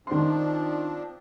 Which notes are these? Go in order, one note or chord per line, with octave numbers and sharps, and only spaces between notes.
D#3 F3 C4 D4 C6